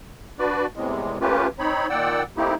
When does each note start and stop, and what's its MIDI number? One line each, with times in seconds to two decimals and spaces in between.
0.39 0.66 62
0.39 0.66 66
0.39 0.66 71
0.39 0.66 74
0.76 1.18 40
0.76 1.18 45
0.76 1.18 48
0.76 1.18 56
1.21 1.47 57
1.21 1.47 58
1.21 1.47 61
1.21 1.47 65
1.21 1.47 67
1.21 1.47 71
1.59 1.87 60
1.59 1.87 63
1.59 1.87 73
1.59 1.87 83
1.90 2.23 46
1.90 2.23 51
1.90 2.23 74
1.90 2.23 78
1.90 2.23 79
1.90 2.23 88
2.37 2.55 57
2.37 2.55 58
2.37 2.55 60
2.37 2.55 63
2.37 2.55 64
2.37 2.55 67